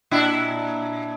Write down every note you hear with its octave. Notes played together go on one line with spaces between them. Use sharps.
A#2 D4 E4